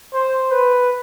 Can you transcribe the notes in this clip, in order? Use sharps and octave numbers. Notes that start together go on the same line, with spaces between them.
C5
B4